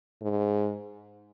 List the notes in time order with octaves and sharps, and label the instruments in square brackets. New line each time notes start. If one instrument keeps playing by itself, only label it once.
[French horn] G#2